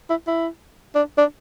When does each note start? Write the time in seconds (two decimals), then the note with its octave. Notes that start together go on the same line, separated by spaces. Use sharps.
0.10 E4
0.27 E4
0.95 D4
1.18 D4